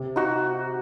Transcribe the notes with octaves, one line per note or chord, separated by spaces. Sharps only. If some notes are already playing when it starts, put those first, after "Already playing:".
Already playing: C3
D#4 F#4